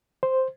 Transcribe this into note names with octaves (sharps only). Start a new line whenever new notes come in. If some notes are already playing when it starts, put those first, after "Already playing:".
C5